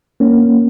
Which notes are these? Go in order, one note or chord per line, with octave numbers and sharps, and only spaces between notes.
A#3 C#4